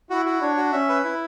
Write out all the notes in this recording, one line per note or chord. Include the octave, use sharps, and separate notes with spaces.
E4 F#4
F#4
D4 C#5
F#4
C#4 E5
B4
E4